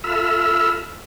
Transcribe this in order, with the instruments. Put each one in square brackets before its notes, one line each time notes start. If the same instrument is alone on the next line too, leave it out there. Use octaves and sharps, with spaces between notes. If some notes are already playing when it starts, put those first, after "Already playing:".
[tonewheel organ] F4 A4 E5 B5 E6 F6